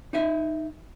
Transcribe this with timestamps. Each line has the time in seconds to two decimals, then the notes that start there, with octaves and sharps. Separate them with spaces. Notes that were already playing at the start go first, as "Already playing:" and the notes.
0.13 D#4 D#5 E5